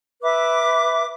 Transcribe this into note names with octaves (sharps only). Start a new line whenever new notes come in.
B4 E5 D6